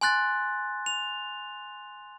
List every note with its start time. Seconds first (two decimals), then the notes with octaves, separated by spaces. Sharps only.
0.01 G#5 C6 F#6 A6
0.86 F7